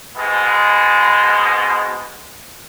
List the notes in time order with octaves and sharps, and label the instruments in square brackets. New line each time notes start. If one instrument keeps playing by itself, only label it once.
[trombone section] G#2 B2 G#3 B3